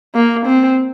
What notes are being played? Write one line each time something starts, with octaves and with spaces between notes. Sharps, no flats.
A#3
C4